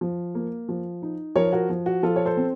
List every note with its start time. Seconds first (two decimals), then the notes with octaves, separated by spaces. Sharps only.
0.01 F3
0.35 A#3
0.69 F3
1.02 D#4
1.36 F3 A#4 C#5
1.53 F#4 A#4
1.69 F3
1.86 F#4
2.03 F3 F4 A4
2.16 C#5
2.25 A4 C5
2.37 C4